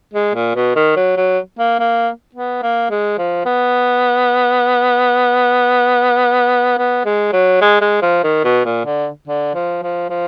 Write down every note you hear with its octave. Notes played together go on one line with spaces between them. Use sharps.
G#3
A#2
B2
D#3
F#3
F#3
A#3
A#3
B3
A#3
G#3
F3
B3
B3
G#3
F#3
G#3
G#3
F3
D#3
B2
A#2
D3
D3
F3
F3
F3